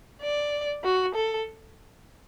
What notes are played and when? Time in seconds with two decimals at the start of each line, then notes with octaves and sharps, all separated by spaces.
0.22 D5
0.84 F#4
1.15 A4